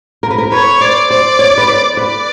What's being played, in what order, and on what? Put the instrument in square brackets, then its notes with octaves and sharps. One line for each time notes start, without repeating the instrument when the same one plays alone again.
[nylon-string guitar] A#4
B4
A#4
[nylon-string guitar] B4 [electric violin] C#5
[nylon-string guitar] C5 [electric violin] D5
[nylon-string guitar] C5 [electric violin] D5
[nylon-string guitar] C#5
B4
C5
[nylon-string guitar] B4 [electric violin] D5